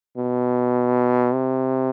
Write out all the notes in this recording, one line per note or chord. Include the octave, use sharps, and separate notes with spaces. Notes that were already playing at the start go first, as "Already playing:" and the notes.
B2
C3